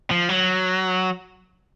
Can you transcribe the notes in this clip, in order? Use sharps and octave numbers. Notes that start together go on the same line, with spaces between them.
F3
F#3